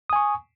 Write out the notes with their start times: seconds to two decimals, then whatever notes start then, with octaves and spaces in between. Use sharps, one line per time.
0.10 D#6
0.13 G#5
0.16 C#6